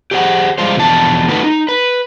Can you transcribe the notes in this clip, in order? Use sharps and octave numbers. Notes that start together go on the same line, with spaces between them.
G4 G#4 C5 E5 F#5
G3 G#3 F4 C5
E2 B2 D3 F3 A5
A3 D#4 F#4 A4 B4
D#4
B4